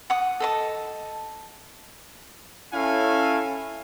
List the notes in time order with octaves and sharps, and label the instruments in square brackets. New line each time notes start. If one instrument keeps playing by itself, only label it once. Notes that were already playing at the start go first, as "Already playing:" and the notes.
[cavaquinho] F#5 D#6
A4 D#5 A5
[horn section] C#4 E4 A4 F5 G#5